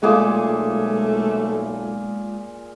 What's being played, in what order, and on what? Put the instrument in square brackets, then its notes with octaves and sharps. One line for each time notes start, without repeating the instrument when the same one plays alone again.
[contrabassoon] B1 [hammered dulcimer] A#2 G#4 D6 [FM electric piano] G#3 F4 [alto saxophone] A3